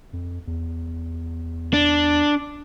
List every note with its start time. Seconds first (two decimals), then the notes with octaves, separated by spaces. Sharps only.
0.13 F2
0.47 E2
1.73 D4